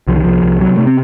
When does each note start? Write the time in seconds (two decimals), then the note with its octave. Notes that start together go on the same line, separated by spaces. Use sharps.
0.07 C2 F3
0.16 D#3
0.23 C2 F3
0.43 C2
0.60 C3 F#3
0.78 C3 A3
0.87 C4